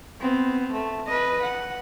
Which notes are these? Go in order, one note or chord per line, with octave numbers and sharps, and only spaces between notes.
B3 C4
A3
B4 D#5
F#5